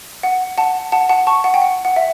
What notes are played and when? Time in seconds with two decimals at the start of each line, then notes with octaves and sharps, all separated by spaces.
0.23 F#5
0.58 F#5 A5
0.92 F#5 A5
1.09 F#5 A5
1.27 A5 C#6
1.44 F#5
1.54 G5
1.62 F#5
1.85 F#5
1.96 E5